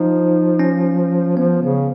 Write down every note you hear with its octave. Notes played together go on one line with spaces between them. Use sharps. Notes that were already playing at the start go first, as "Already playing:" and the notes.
Already playing: F3 D#4
C#4
F3 B3
C#3